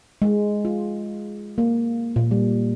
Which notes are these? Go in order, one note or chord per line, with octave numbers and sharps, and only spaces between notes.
G#3
F4
A#3
A#2
G3